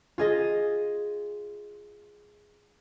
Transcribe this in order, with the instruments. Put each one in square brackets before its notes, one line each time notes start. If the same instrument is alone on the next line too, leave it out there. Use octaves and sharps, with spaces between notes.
[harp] F4 G#4 D#5